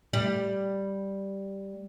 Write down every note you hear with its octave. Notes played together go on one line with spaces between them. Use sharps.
G3